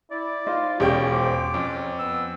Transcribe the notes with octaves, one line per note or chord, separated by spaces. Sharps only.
E4 D5
D#4 F4 C5 D#5
E1 C#4 G4 D5 G5
C5 D6
F2 C#4
B3 E6